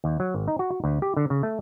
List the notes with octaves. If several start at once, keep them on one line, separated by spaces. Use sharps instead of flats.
D#2
F#3
G#1
D#4
F#4
F#4
D2
G4
D3
C#3
A3